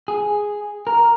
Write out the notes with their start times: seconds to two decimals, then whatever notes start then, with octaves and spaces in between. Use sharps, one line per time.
0.08 G#4
0.87 A#4